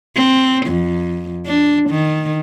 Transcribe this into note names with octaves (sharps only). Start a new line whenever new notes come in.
C4
F2
D4
D#3